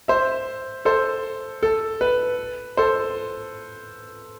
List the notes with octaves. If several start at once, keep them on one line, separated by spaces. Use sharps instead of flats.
C5 E5
A4 C5
A4
B4
A4 C5